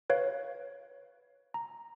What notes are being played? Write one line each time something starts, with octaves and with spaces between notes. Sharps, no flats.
B4 C#5 F5
A#5